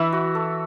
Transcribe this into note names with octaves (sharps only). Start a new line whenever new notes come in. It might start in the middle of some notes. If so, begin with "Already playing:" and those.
Already playing: E3 E5
F#4
A4